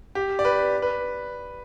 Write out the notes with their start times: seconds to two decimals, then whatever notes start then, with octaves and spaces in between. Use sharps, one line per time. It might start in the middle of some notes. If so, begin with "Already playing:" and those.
0.15 G4
0.39 D5
0.45 B4
0.82 B4